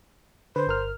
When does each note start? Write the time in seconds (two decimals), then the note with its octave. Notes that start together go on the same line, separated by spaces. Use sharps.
0.56 D3 B4 C5
0.67 G1 A#4 F6